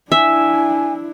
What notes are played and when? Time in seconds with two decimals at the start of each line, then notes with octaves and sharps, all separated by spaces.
0.12 D4 E4 E5 G#5